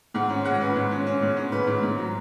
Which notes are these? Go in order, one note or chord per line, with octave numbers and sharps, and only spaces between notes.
G#2 F#5
C#4
G#3 F#5
C#4 B4
G#2
C#4
C#4
G#2
C#4
G#2 B4
G#2
G#2
F#3